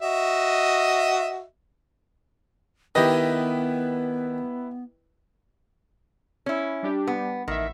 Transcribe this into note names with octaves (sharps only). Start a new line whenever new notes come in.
F#4 D#5 E5
D#3 B3 E4 G4 B4 D#5
C#4 E4
G3 D4 G4
B3
A1 D#3 E5